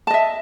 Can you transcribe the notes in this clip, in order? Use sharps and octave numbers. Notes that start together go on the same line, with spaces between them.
D#5 E5 A5